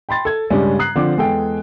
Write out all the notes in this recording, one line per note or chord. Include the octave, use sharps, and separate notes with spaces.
G5 B5 C6 A6
A4 G#6
G2 C#3 G3 G#3 C#4 D4
A#5 D#6 F#6 C7
D3 F3 C4 D4 D6
E2 G#3 G#4 A4 G5